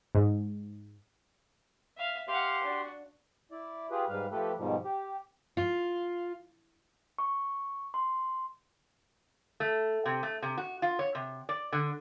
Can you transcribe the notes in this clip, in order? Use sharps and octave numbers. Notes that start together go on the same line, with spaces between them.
G#2
E5 F5
G4 F5 F#5 C6
D4 F#4
E4 D5
F4 G4 G#4 B4
G#2 G3 B4 F5
F3 A3 G4 A4 B4
G#2 B2 D#3 F3 G3
G4
F4
C#6
C6
A3
C3
A3
C3
F#4
F4
C#5
C3
D5
D3